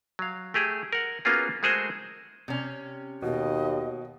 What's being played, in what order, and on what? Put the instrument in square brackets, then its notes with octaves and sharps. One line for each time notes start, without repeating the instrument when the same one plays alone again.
[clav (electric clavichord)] F#3 F5
A3 G4 G#4
A#4 F#5
A#3 B3 C#4 F4 F#4 G#4
G#3 A3 F#4 G#4 A#4 C5
[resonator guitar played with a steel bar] C3 C#4
[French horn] D#2 [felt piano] B2 [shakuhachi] D#5